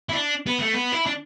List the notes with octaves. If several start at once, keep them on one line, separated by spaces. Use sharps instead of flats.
E4
D4
B3
A3
B3
E4
D4